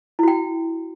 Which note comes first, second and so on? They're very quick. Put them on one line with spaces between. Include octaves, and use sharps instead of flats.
E4 F#4 G5